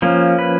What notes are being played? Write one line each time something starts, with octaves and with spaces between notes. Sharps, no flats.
F3 A#3 C#4
B4